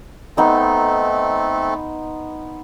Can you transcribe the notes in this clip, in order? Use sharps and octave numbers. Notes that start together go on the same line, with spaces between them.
A3 B3 C4 D#4 A4 C6